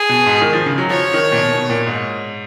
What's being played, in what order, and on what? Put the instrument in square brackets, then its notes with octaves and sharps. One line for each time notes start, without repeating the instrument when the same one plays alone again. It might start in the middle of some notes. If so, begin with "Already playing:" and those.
Already playing: [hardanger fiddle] G#4
[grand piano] B2
G#2
D#3
F3
C#3
F#3
[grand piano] F3 [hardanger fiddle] C#5
[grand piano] D#3
A#2
B2
B2
A#2
G#2